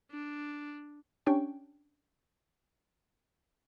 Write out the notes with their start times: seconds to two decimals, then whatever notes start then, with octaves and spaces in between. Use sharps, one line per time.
0.11 D4
1.26 C#4 D4 G4 C#5 G5 C#6